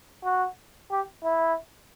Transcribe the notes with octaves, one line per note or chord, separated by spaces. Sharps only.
F#4
G4
E4